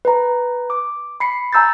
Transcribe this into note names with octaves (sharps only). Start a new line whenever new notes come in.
B4 A#5
D6
B5 C7 C#7
G#5 A#5 E6 G6 A6